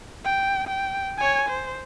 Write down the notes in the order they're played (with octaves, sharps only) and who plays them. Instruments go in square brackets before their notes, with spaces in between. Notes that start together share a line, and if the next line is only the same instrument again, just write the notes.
[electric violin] G5
G5
C#5 G#5
C5